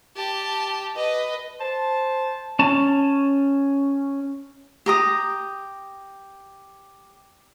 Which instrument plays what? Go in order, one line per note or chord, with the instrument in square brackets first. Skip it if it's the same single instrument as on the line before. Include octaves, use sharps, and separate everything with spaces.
[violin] G4 A5
B4 D#5
[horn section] C5 A5
[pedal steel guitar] C#4 A5
[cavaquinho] G4 A#5 D#6